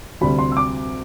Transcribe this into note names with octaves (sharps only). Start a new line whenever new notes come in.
D2 C3 G3 B5
C6
E6
D6